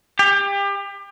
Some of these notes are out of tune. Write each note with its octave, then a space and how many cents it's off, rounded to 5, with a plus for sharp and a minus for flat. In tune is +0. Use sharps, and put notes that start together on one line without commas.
G4 +30